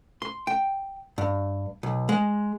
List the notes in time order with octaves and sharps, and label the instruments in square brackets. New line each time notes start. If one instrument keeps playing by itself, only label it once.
[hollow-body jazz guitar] C6
G5
G2
B1
G#3